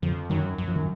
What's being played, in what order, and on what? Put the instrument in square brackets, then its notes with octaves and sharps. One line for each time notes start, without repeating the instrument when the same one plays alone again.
[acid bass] F2 [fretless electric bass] D3 F3
[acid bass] F#2 [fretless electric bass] D#3 F#3
[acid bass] F#2 [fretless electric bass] F#3
[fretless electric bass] F3
D#3 F#3